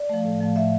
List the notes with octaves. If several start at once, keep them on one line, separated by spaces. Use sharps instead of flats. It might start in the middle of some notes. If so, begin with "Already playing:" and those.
Already playing: D5
F3 A3
A2
F3 A3
A2 E5